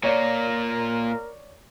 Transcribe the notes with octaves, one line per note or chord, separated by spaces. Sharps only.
A#2 A#3 A#4 C#5 D5